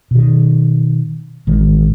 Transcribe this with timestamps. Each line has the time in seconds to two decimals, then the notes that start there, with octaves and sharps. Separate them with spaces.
0.11 B2 D#3
1.47 A1 D#3 G#3